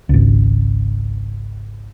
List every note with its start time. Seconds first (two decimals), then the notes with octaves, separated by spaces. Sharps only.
0.09 G#1 C#2